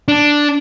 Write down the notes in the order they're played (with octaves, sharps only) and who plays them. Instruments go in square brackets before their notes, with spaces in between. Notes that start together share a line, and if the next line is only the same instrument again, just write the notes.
[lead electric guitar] D4